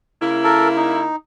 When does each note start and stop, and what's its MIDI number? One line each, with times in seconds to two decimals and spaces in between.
0.21 1.08 49
0.21 1.08 58
0.21 1.08 64
0.44 0.68 69
0.44 0.68 70
0.76 1.16 63